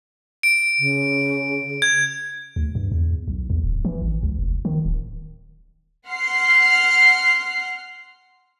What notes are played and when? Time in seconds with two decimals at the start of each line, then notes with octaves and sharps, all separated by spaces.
0.43 D7
0.79 C#3
1.82 G#6
2.56 D2
2.75 G2
2.92 E2
3.28 B1
3.50 E2
3.64 D1
3.85 E3
4.02 G#1
4.23 C#2
4.39 F1
4.65 D#3
4.85 D1
6.07 F#5 C6 F6 C7